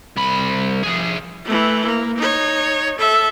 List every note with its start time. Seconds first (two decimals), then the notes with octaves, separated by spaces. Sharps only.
0.17 C2 B5
0.83 F3 G#4
1.45 E3 A3
1.85 A#3
2.18 D#4 C#5
2.98 A4 E5